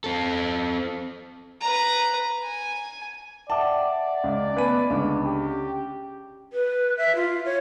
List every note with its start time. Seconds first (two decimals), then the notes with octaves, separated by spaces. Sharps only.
0.04 C4 A4
1.61 B4 A#5
2.43 G#5
3.50 D5 E5 F#5 G5 A5 D6
4.24 C#2
4.56 A3 B3 B4 G#5 B5 D#7
4.90 C#2 D3 C#4
5.25 G4
6.53 B4
6.98 E5
7.16 F4
7.45 C#5